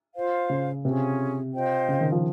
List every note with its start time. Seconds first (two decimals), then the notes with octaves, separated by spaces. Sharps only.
0.15 F4 C5 F5
0.50 C#3
0.84 C3 C#4 F4 G#4
1.54 F4 C5 D#5 G5
1.88 C#3
2.01 D#3
2.12 F3